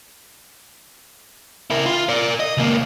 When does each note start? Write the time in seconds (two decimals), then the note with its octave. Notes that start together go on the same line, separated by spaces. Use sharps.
1.70 E4 A#4
1.86 F4
2.09 A#4 D5
2.40 D#5
2.57 C#2 A#3